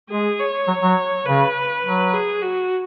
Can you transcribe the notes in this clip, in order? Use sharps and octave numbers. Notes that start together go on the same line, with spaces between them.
G#3 G#4
C#5
F#3
F#3
C#3 B4
F#3
G#4
F#4